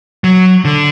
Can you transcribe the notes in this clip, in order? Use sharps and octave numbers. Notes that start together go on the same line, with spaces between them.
F#3
D3